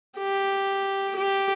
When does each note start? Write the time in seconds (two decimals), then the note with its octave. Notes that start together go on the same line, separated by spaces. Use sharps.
0.18 G4
1.16 G4